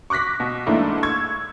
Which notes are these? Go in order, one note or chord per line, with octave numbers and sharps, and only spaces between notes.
C#6 D6 F#6 A#6 B6
B2
G#2 E3 A3 A#3 D4 E4
C#6 E6 G#6